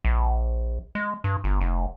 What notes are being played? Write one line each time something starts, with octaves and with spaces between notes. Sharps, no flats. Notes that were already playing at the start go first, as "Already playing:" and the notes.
A#1
G#3
G2
G1
F1